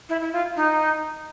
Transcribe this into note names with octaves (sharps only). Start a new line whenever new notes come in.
E4
E4
F4
D#4